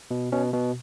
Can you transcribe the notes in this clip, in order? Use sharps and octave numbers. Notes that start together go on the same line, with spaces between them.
B2
B2 C#4
B2